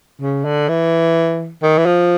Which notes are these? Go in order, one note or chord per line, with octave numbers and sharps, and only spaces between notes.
C#3
D3
E3
D#3
E3
F3